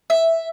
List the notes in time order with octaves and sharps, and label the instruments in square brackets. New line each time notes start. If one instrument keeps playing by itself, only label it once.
[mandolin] E5